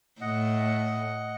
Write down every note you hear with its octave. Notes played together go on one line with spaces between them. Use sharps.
A2 D#5 F#5